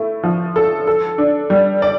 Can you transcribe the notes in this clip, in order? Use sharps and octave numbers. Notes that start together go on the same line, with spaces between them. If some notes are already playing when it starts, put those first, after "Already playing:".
Already playing: A3 E4
F3
A4
A4
D4
G3
D5